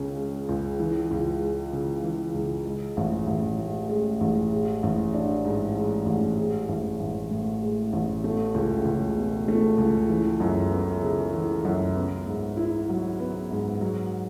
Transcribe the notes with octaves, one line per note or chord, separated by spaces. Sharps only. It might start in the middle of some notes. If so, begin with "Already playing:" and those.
Already playing: C#2 C#3 C#4
G#3
C#2
E3
C#2
G#3
C#3
E3
C#2
G#3
A1
A1
A2
G#3
A1
G#3
A1
D4
G#2
G#3
A1
G#3
A1
A1
A2
G#3
A1
A3
C#2
C#2
B2
A3
C#2
E3
F#2
B3
C#3
E3
F#2
B3
G#2
E4
F#3
B3
G#2
F#3